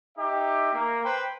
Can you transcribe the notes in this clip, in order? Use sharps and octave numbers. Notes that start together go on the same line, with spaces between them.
D#4 G4 E5
A#3
B4 C5 G5